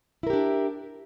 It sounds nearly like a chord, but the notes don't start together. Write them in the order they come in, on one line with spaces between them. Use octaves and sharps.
E4 A#4 G4 D4